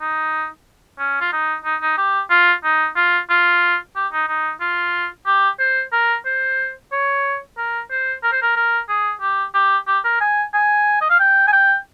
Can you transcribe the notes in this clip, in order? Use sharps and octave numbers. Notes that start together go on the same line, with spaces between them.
D#4
C#4
F4
D#4
D#4
D#4
G4
F4
D#4
F4
F4
G4
D#4
D#4
F4
G4
C5
A#4
C5
C#5
A#4
C5
A#4
C5
A#4
A#4
G#4
G4
G4
G4
A#4
G#5
G#5
D#5
F5
G5
G#5
G5